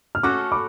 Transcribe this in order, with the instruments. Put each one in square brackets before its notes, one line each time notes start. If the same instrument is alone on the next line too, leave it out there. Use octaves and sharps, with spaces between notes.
[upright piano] F6
[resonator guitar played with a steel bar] A3 C#4 F#4 A4 [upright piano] D6 F#6
[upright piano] B5 D6